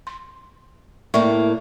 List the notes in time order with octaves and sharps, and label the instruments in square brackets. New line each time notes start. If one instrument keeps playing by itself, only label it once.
[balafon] C6
[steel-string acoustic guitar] A2 A#3 [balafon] D5 E5 C#6